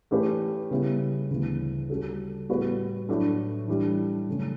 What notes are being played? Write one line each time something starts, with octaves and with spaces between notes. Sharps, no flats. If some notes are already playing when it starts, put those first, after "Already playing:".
E3 A3 C#4 G4 B4
C#3 G3 B3 E4
D2 C#3 E3 G3 B3
C#3 G3 C#4 F#4 A4
A2 G3 B3 F#4 B4
A2 F#3 A3 D4 F#4
E3 G3 D4
F#2 C#3 E3 A3 C#4